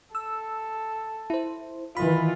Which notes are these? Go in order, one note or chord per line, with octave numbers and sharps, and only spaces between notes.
A4 E6
E4 C5
D#3 E3 F4 B5